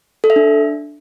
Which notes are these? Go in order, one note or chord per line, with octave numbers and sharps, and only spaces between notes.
A4
E5
D4